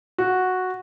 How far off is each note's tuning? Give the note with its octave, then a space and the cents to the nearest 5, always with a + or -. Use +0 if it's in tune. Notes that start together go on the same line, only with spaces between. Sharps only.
F#4 -5